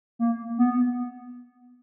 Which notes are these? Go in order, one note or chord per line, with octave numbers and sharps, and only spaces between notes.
A#3
B3